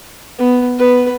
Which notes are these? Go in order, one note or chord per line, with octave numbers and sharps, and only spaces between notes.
B3
B3 B4